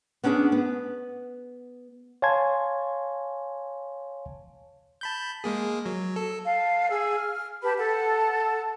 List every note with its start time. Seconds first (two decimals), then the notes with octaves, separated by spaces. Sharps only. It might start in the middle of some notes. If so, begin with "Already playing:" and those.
0.24 B3 C#4 D4 G4 G#4
0.52 B3
2.22 C#5 F5 G#5 A5 C6 G#6
5.01 A5 B5 G6
5.44 G#3 A#3 G#4
5.86 F#3
6.16 A4
6.45 F5 A5
6.89 G#4 E6
7.15 F6
7.63 G4 B4 A5 B5
7.78 A4 F#5 A5